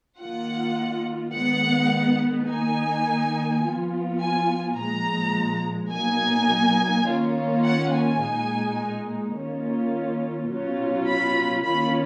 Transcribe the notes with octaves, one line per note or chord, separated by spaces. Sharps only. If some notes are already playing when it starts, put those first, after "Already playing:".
D#3 A#3 F4 F#5
D#3 G#3 B3 F#5
D#3 A#3 D#4 G#5
F3 B3 F4
G#5
A#2 F3 G#3 A#5
B2 F#3 A#3 D#4 G#5
D#3 A#3 C#4 F4
F#5
G#5
A#2 G#3 D#4
D#3 A#3 C#4 F4
B2 F#3 C#4 F4
B5
D#3 A#3 C#4 F4 B5